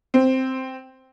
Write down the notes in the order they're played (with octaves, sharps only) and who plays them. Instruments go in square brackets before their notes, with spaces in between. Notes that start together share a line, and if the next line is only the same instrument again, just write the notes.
[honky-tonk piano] C4